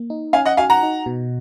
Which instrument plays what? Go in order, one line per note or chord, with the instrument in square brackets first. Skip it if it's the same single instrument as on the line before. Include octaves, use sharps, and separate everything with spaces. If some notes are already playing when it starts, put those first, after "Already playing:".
Already playing: [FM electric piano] A#3
D#4
[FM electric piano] C#4 [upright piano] F5 G#5
[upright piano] D#5 F#5
[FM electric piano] F#4 [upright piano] F5 G#5
[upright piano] F#5 A#5
[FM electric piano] D#4
B2